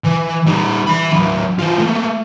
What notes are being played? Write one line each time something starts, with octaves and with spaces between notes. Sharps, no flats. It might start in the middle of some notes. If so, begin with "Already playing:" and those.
E3
G3 D#4
E3 B5
F#3 D4
E3 F4
A3 A#3